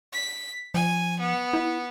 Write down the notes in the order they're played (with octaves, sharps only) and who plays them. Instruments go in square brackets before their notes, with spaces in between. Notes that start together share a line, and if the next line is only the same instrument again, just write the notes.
[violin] B6
[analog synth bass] F3 [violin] G#5
[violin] B3
[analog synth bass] E4